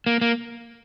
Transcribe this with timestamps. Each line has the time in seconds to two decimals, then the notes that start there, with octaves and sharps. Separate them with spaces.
0.06 A#3
0.21 A#3